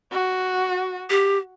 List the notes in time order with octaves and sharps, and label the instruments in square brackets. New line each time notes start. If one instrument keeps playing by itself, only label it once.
[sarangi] F#4
[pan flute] G4